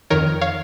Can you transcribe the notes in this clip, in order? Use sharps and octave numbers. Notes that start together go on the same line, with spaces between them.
F2 D#3 A#4 C#5
C#5 F5